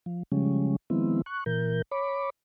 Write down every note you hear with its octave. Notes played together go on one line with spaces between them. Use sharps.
F3
C#3 F3 G3 G#3 C#4
D#3 F3 G#3 B3 C4 E4
C#6 F#6
A#2 E3 A#4 G6
C#5 B5 D6